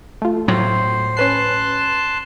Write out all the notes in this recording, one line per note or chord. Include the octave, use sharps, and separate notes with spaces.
A3 F4
A2 F#3 C5
C#4 B4 A5 C6 F#6 C7